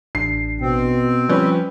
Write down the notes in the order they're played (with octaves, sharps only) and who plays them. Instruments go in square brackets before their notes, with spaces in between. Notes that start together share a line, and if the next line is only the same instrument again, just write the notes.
[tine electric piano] A1 D4 [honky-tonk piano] C7
[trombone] B2 [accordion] C4
[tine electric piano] F3 [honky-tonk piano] G3 C#4 B4